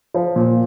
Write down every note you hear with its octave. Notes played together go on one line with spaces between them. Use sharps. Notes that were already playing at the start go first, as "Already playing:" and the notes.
F3
A#2